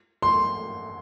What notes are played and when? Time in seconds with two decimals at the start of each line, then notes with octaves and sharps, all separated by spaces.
0.22 C6